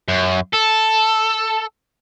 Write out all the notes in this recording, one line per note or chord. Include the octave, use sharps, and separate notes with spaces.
F#2
A4